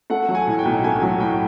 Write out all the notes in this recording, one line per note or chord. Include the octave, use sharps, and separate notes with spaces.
A3 F#5
F#3
G#5
A2
G5
B1
A3 G#5
F#3
A2 G5